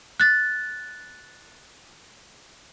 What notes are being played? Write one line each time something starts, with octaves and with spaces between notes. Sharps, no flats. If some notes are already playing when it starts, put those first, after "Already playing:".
F#6 A6